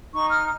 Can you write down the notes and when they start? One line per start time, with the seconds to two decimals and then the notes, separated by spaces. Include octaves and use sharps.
0.12 D#4 C#6
0.30 F6